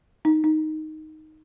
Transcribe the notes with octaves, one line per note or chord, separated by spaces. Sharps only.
D#4
D#4